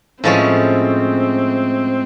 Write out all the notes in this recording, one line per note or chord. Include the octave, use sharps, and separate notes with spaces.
A2 F3 G#3 C4 C#4